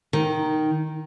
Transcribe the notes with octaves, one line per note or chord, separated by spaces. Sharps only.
D#3